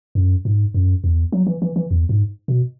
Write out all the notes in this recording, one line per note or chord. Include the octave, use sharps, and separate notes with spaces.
F#2
G#2
F#2
E2
F#3
E3
E3
E3
E2
G#2
B2